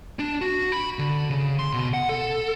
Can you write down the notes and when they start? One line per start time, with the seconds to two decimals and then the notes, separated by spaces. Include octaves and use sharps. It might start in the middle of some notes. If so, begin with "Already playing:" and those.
0.19 D4
0.42 F#4
0.72 B5
0.99 D3
1.30 C#3
1.59 C6
1.73 B2
1.93 F#5
2.09 A4